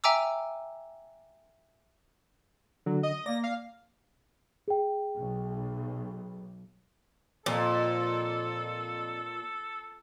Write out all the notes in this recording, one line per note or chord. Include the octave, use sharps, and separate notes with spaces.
E5 G5 G#5 A#5 D6 E6
D3 F#3
D#5
A#3 D5 A#6
F5
G#4 G5
B1
F2 A#2 A4